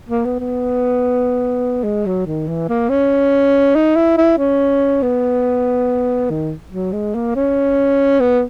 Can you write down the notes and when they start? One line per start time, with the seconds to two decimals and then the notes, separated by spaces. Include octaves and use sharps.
0.09 A#3
0.25 B3
0.40 B3
1.84 G#3
2.06 F#3
2.26 D#3
2.47 E3
2.69 A#3
2.89 C#4
3.75 D#4
3.96 E4
4.17 E4
4.38 C#4
5.03 B3
6.30 D#3
6.72 F#3
6.92 G#3
7.15 A#3
7.35 C#4
8.20 B3